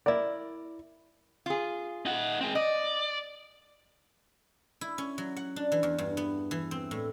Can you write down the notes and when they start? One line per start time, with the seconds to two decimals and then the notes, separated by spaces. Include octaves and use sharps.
0.06 E4 A#4 D5
1.46 F4 G#4
2.06 D#4 F#5
2.41 G#3 C4
2.55 D5 D#5
4.81 E4
4.98 C#4
5.18 F#3
5.36 F#5
5.56 D4
5.72 E3
5.83 E2
5.98 G2
6.17 B3
6.51 E3
6.71 C4
6.91 A2